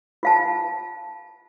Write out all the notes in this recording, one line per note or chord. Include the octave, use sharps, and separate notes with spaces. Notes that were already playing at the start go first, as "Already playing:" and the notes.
F4 F5 A5